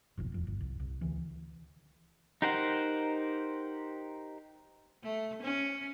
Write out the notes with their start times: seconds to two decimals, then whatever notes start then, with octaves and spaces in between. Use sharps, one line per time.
0.17 F#1 B1 F2
0.32 D#1 F2
0.47 G1
0.61 C2
0.80 C2
1.01 D2 E3
2.42 D#4 G4 A#4 C5 F#5
5.03 A3
5.42 C#4